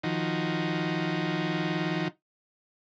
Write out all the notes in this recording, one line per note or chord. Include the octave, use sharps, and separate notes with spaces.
D#3 F3 D#4 F#4